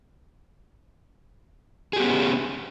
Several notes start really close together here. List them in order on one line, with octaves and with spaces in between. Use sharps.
G#4 G4 B3 C#4